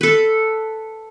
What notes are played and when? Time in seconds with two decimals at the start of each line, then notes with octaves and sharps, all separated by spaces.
0.01 A4 B4